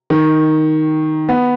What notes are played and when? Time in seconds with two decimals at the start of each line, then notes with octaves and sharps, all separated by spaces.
0.10 D#3
1.29 B3